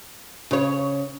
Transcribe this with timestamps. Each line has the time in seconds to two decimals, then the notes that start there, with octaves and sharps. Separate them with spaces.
0.51 C#3 C#5